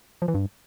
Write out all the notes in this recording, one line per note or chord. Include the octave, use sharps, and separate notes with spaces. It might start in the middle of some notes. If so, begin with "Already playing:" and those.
F3
E3
G2